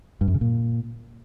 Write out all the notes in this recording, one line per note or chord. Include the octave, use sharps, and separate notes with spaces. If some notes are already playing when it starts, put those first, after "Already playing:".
G2
F#2
C#3
A#2